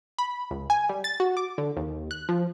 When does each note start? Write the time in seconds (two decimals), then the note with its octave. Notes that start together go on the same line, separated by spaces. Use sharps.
0.18 B5
0.51 C#2
0.70 G#5
0.89 G3
1.04 A6
1.20 F#4
1.37 D6
1.58 D3
1.77 D#2
2.11 F#6
2.29 F3